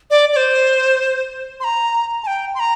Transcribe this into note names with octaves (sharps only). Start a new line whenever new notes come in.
D5
D5
C5
C6
A#5
A5
G5
C6
A#5